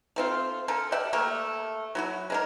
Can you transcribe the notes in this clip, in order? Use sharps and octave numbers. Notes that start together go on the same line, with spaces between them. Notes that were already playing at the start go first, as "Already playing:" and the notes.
A3 C4 F4
D3 A4 A#4
G4 D5 E5 F#5
A3 A#3 G4
F#3 E4 F#4
G#3 D4 A#4